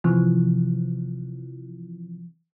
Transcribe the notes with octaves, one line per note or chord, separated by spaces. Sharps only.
C3 E3 F3